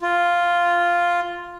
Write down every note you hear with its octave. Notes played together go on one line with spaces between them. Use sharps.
F4